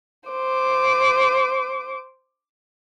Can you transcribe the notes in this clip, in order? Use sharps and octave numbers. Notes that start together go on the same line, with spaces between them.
C5 D6